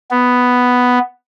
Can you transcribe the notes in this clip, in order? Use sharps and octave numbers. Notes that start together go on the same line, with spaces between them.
B3